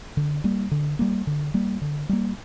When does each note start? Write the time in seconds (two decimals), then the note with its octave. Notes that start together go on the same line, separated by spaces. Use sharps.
0.17 D3
0.44 G3 A#3
0.71 D3
0.99 G3 A#3
1.27 D3
1.54 G3 A#3
1.82 D3
2.09 G3 A#3